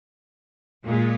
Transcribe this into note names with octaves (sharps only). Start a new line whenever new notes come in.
A#2 G#3